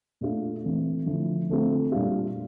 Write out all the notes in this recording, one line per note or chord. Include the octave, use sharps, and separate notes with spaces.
A#2 A3 D4 F4
E3 A3 C4
D3 F3 A3 E4
D3 A3 C4 F4
A#2 G3 D4 F4